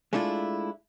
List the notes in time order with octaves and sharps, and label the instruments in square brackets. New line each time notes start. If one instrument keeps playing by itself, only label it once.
[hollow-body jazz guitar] G#3 A3 D4 E4 F4